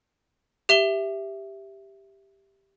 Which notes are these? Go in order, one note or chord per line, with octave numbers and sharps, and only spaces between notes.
G4 E5 E7 G7